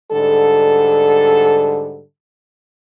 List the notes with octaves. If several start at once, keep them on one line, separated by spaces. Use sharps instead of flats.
G#2 D3 G3 A4